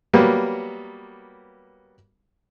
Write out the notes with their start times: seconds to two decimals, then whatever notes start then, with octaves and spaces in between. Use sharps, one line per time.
0.13 F#3 G3 A#3 B3